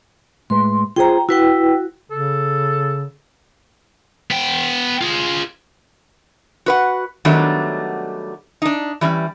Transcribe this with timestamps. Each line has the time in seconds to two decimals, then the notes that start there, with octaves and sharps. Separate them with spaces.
0.50 A2 G#3 B4 C6
0.96 F4 G#4 C5 G5 A#5
1.29 E4 F#4 B4 G5
2.11 C#3 A4
4.31 B3 G5
5.01 F4 G#4
6.66 F#4 B4 F#5
7.25 D#3 F#3 G3 A3 B3 D4
8.62 D4 D#4
9.01 E3 G3 C#4